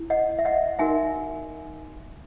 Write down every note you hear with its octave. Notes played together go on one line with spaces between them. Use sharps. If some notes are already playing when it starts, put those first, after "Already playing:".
Already playing: E4
D#5 F#5
E5
D#5 F#5
D#4 F#4 A#4 E5 G#5